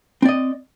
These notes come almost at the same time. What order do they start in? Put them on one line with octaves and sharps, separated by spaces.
C4 D5 D#5